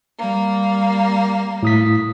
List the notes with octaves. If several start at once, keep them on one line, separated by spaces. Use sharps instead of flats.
G3 A#3
A2 D#6 B6